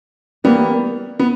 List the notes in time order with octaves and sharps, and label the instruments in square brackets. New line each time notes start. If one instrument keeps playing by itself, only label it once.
[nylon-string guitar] E3 G3 A#3 [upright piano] B3
[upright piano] B3